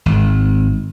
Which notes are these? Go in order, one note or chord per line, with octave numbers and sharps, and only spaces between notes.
G#1